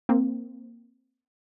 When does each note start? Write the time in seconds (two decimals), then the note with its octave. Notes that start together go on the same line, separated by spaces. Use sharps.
0.09 A#3 C4